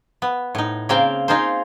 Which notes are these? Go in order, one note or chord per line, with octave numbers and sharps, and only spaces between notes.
B3
A2 D#4
C#3 A#3 C4 A#4 F5 G5
D#4 F4 G#4 A#4 C5